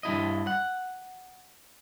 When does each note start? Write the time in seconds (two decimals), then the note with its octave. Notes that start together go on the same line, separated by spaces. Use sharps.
0.03 G2 B2 E4 D#5
0.47 F#5